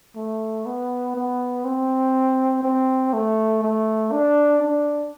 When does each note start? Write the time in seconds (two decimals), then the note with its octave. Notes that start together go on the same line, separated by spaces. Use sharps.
0.15 A3
0.66 B3
1.15 B3
1.65 C4
2.63 C4
3.13 A3
3.63 A3
4.12 D4
4.62 D4